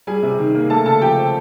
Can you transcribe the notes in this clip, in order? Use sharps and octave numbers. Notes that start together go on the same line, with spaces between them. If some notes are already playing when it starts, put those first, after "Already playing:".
G3 G#4 G#5
C3
D#3
A#3
A3 A4 A5
C#3 A4 A5
F3 G4 G5
C4